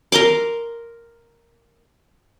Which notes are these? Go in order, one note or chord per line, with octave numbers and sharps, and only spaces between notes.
A#4 A#5 C6 D6